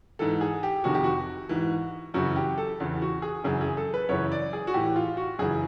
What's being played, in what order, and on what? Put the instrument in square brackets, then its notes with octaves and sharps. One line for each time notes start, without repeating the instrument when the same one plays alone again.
[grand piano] G#2 E3 A4
G#4
G4
F2 C3 D#3 F#4
G4
F#4
G#2 E3
F#2 C#3 E3 F#4
G4
A4
E2 C#3 E3
F#4
G#4
F#2 C#3 E3 G#4
G#4
A4
B4
F#2 C#3 E3 C#5
D5
G#4
F#4
A2 E3 G4
F4
F#4
F#2 C#3 E3 G#4